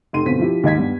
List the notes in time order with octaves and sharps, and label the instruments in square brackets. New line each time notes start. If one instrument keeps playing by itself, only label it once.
[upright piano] F1 D#4 C6 D#7
G1 B2 C4 C5 B6
F3 E4 G4
D#2 G#2 D#5 G#6 B6
G2 B3